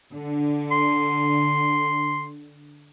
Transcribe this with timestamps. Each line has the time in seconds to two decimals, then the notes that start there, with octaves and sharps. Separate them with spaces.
0.14 D3
0.72 C6